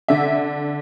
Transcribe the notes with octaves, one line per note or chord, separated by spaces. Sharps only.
D3 E5